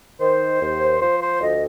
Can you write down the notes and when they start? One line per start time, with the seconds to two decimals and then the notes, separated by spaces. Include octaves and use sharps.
0.20 D#3 C5
0.60 D#2
1.01 F3 C5
1.21 C5
1.42 D2 D#5